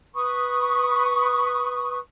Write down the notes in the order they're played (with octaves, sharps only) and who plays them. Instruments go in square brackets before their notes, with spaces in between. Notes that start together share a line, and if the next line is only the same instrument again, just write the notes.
[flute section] B4 B5 C#6 D#6